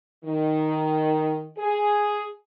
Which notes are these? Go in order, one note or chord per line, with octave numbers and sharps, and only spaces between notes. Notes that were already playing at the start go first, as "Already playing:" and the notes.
D#3
G#4